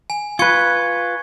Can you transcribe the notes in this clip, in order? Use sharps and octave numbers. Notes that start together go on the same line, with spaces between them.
G#5
F4 B4 C#6 G#6 C#7